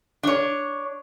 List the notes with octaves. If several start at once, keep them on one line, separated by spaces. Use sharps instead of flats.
D4 C#5